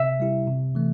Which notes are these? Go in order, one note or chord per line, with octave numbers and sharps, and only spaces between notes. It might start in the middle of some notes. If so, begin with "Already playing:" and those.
Already playing: C3 E5
G3 E4 G4
C3
E3 A3